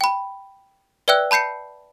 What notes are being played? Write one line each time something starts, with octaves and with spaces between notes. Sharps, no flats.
G5 B5
B4 D5 E5 G5 E6 F#6
A5 B5 G6 C7 C#7